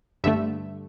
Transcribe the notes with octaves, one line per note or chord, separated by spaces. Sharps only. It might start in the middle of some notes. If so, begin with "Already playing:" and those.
G2 D3 A3 E5